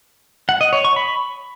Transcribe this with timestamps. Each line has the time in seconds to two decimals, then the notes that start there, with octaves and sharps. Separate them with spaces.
0.49 F#5
0.61 D#5
0.73 C#5
0.84 C#6
0.96 B5